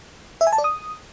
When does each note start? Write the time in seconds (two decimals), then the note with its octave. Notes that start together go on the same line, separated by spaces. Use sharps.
0.41 E5
0.47 G#5
0.53 A5
0.58 D5
0.64 D#6